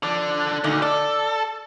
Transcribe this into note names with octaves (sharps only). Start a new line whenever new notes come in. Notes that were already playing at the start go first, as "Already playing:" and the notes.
D3 F3 D4
D2 A#2 D3 D#4
A4 D5